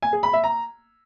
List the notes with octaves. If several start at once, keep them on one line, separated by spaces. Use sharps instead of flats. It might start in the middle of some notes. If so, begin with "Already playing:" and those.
G#5
G#4
B5
E5
A#5